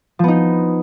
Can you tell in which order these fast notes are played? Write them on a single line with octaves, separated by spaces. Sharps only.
F3 B3 D#4